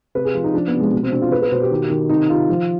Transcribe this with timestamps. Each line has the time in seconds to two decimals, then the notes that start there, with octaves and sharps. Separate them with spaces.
0.15 C3 B4
0.25 G#4
0.34 F3 F4
0.44 D#4
0.54 F3 D4
0.67 B3
0.73 C3
0.80 G#3
0.93 B2
1.03 C4
1.12 B2 D4
1.22 F4
1.32 B2 B4
1.42 B4
1.51 B2 C5
1.62 G4
1.71 D#3
1.90 D#3
2.09 C3 D#4
2.29 C3 F4
2.49 F3